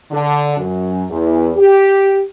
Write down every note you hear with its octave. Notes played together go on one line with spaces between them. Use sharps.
D3
F#2
E2
G4